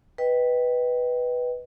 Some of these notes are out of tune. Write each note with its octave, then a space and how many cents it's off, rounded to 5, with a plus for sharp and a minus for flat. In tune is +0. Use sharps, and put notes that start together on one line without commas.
B4 +0 D#5 +0 G5 +0